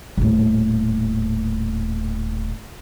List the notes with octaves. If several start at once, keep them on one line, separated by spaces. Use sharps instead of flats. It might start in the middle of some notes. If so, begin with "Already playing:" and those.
D#1 A2